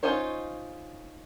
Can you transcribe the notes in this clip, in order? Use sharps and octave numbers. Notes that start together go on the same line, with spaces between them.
C#4 D#4 F4 C5 C#5